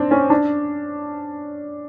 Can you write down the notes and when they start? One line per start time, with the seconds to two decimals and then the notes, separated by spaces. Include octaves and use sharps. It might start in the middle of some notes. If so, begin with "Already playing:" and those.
Already playing: C4 D4
0.11 C#4
0.30 D4